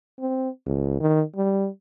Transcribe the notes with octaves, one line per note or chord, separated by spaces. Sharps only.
C4
C#2
D#3
G3